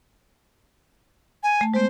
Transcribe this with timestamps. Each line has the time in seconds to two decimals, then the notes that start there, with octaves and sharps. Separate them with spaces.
1.43 G#5
1.61 A3 A5
1.74 G#3 B3 C5